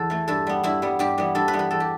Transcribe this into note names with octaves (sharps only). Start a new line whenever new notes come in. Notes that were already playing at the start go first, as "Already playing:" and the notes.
Already playing: E2 A4
E3 A3
G2 A4
G3 B3
G2 E4
G3 B3
G2 G4
E3 G3 B3
G2 A4
B4
E3 G3 B3
B4
E2 A4
G4